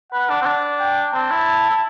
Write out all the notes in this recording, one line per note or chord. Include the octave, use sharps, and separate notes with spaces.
B4 F#5
D4
C4
D4
G5
C4 A5
E4
E4